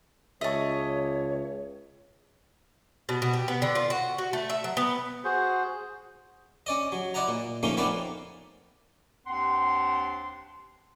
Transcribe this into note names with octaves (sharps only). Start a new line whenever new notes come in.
C#2 C#5 D#5 E5 A5 C#6
B2
B2
G4
B3
D3
F4
F#4
F#4
A3
E5
F#3
B3
F#4 G#4 C5
C#4 D5 D#5
F#3
E4 D5 D#5 F#5 A#5
A#2
F3 A3 A#3 C#4 D#4 F4
E3 B3 C4 A#4 B4 D5
D#2 C4 D4 F#5 C6